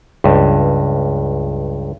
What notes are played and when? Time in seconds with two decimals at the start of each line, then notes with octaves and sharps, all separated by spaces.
0.24 C#2 G2